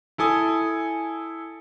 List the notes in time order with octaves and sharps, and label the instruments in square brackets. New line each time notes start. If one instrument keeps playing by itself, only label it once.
[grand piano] E4 A4 G#5 D#6